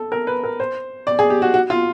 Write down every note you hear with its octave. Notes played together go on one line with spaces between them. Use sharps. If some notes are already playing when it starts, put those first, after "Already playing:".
Already playing: A4
A#4
B4
A#4
C5
D5
G#4
G4
F#4
F#4
F4